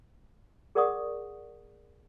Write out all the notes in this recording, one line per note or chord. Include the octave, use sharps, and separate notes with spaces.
G#4 A#4 D5 F#5 C#6 D#6